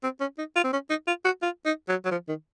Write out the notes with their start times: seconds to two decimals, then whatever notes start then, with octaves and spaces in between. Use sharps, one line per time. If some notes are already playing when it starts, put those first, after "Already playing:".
0.03 C4
0.20 C#4
0.38 D#4
0.56 F4
0.64 C4
0.73 C#4
0.90 D#4
1.07 F4
1.25 F#4
1.42 F4
1.65 D#4
1.88 F#3
2.05 F#3
2.11 F3
2.28 D#3